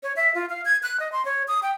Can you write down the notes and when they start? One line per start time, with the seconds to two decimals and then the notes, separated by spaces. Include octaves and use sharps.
0.03 C#5
0.16 E5
0.35 F4
0.49 F5
0.65 G#6
0.83 F#6
1.00 D#5
1.12 C6
1.25 C#5
1.48 D#6
1.63 G5